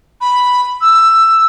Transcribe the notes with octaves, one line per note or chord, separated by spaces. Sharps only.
B5
E6